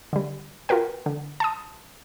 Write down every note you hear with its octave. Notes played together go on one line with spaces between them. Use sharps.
D3 G3
F4 F#4 A#4 B4 G5
D3
A5 C6 D#6